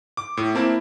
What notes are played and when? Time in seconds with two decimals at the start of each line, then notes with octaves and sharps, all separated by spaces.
0.17 D6
0.37 A2
0.55 A#3 C4 E4 A5